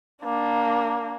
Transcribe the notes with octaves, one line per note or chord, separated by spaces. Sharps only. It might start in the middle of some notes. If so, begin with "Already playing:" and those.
A#3 D4